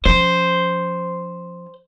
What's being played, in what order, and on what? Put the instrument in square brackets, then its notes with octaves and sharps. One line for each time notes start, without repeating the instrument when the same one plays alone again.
[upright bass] F3 C#4 [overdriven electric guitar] C5